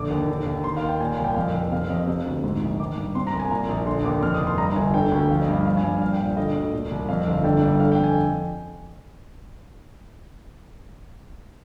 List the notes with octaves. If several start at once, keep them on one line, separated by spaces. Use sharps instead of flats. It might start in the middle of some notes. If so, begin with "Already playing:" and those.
Already playing: A#1 D3 D6
D#2
D3
D#2
D#3 C6
F5
D#2
G5
A#2 G#5
G#5
C2
G5
F2 F5
F1
C3 F5
F5
F2 D#5
C3
D2
G#2
A#1
D#3 D6
G2
C3 C6
A#5
C2
G#5
A#2 A#5
A#1
D3 C6
D#2 D6
F2 F6
D#6
F1
C6
G2 A#5
G1 G#5
D3 G5
D2
F3 F5
D#5
G2
F5
F3 F5
G#5
G2
F5
A#2 F5
G5
A#1
F5
D3 D#5
D2
A#2
C2
F2 F5
F5
G1
F5
D3 G5
G2
D3 F5
G5
F2
G#5